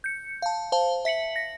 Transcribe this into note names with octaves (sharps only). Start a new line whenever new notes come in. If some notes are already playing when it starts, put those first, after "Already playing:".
G6 C#7
F5 A5
C5 F5 A5
E5 B6 C#7 F#7
A#6